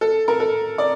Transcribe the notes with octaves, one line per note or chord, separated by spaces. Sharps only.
A4
A#4
A4
D5